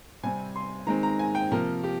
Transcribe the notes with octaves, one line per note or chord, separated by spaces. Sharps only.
C3 G3 C4 G#5
C6
D#3 G#3 C4 A#5
A#5
G#5
G5
C3 F3 A#3 A#4
G4